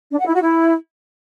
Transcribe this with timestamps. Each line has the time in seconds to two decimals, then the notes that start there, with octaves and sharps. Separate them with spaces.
0.11 D4
0.19 F#5
0.27 E4
0.34 F#4
0.42 E4